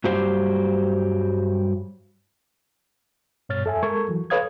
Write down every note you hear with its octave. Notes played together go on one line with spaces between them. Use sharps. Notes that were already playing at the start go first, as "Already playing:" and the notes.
G2 F#3 G3 G4 C5
G2 B2 C#5 F6 A6
F2 A4 E5 G#5
G#3 A4 A#4 C#6 G#6
E3 F#3
A4 B4 C#5 F5 D#6 G#6